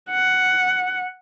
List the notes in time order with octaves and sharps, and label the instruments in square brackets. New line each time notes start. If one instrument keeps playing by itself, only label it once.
[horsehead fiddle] F#5